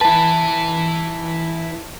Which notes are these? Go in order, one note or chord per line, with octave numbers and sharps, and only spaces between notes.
E4 B4 A5